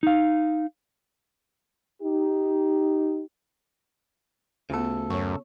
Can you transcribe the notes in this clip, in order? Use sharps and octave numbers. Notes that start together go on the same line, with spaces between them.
D#4 F5
D#4 G4
D2 C#3 B3 F4 A4
F#2 C#5 C#6